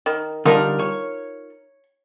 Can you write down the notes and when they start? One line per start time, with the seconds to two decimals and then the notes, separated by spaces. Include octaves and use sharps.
0.06 D#3
0.45 D3 G3 D4 D#4 F4 A#4
0.80 C#5